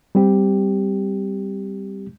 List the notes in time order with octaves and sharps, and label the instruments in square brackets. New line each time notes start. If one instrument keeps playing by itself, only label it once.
[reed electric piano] G3 C4 G4